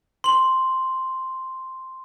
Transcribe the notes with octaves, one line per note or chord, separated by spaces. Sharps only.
C6 F#7